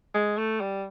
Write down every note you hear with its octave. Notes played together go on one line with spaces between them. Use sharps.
G#3
A3
G3